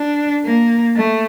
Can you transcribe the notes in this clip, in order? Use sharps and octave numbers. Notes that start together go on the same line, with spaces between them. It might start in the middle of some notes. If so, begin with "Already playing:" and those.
Already playing: D4
A#3
A3